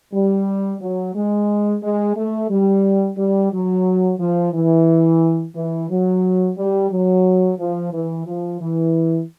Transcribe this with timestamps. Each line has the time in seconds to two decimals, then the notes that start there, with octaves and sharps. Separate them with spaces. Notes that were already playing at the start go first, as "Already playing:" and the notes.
0.14 G3
0.81 F#3
1.15 G#3
1.83 G#3
2.17 A3
2.50 G3
3.18 G3
3.53 F#3
4.20 F3
4.53 E3
5.56 E3
5.90 F#3
6.58 G3
6.91 F#3
7.59 F3
7.93 E3
8.27 F3
8.61 E3